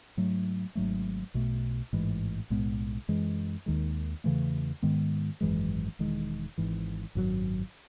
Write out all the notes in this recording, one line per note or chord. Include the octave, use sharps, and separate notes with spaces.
G#2 F#3 A3
G#1 G#2 F#3 A3
B1 B2 A3
A1 G#2 E3 G#3
B1 A2 G#3 B3
F#2 E3 G#3
D#2 D#3 G#3
E2 C#3 E3 A3
G#2 D#3 G#3 B3
G#1 F#2 E3 G#3
E1 E2 D#3 G#3
G#1 G#2 E3
G#1 F#2 D#3 F#3